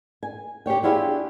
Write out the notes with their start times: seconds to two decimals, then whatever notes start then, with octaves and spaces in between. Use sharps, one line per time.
0.23 G#5
0.66 G4 C5 C#5 G5
0.83 B3 D4 E4 F4 G4 G#4